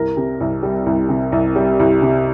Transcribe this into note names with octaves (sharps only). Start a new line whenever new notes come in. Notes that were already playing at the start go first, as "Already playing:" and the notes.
Already playing: C2 A#4
C3
C2
G3
C2
C3
C2
G3
C2
C3